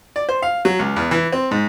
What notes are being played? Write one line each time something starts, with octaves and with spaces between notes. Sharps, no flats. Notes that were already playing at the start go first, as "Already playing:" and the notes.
D5
C5
F5
F#3
C#2
E2
E3
C4
G#2